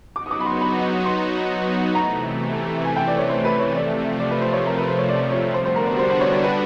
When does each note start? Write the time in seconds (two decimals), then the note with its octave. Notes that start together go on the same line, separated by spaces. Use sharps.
0.16 F#3 B3 D#4 F#4 D6
0.26 D#6
0.31 D6
0.40 B5
0.46 C6
0.61 B5
1.05 C6
1.95 C3 E3 A3 A#5
2.85 G#5
2.96 G5
3.07 D5
3.19 C#5
3.30 C5
3.45 B4
3.60 C#5
3.75 C3 F3 A3 D5
4.20 D5
4.31 B4
4.42 C5
4.53 C#5
4.66 A#4
4.77 B4
4.88 C5
4.99 C#5
5.09 D5
5.32 C#5
5.54 D3 G3 B3 D4 F#4 C5
5.66 C5
5.76 A#4
5.87 C5
5.99 C5
6.10 C5
6.21 C#5
6.32 C#5
6.44 B4